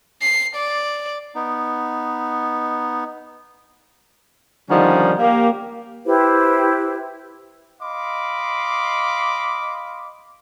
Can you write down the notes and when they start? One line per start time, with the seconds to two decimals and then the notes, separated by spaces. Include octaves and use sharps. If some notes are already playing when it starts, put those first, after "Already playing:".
0.21 C7
0.56 D5
1.35 B3 D#4
4.70 D3 D#3 F3 G3 C#4 D#4
5.19 A#3 G4
6.06 E4 G4 B4 C5
7.81 D#5 F5 B5 C6 D6